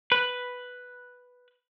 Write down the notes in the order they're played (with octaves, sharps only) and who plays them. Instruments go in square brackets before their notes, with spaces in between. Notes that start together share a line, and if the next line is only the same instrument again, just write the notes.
[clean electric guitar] B4